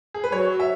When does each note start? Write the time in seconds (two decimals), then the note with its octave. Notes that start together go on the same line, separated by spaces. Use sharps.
0.14 G#4
0.24 B4
0.32 F#3 C#5
0.60 E5